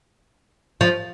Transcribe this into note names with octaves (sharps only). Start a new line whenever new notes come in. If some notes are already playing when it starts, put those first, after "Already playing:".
F3